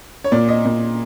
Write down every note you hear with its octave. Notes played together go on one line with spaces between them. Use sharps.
C#5
A#2 D5
D#5
A#2